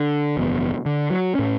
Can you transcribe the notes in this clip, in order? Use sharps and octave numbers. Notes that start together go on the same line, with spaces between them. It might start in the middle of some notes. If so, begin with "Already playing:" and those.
Already playing: D3
F#1 E2 B2
D3
F#3
A2 C#4